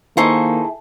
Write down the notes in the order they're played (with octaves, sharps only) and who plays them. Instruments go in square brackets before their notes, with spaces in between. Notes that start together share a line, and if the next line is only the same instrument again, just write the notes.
[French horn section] D#3 A#3 [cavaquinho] D#4 C5 C#6 [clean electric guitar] E4 G#4 A4